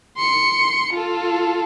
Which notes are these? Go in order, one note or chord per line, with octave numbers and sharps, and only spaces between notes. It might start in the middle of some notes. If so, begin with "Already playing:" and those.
C6 C#7
F4 A4